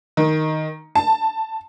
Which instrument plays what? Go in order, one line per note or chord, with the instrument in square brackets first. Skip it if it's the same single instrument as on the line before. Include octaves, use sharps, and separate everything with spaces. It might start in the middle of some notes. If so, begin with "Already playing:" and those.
[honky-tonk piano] D#3
A5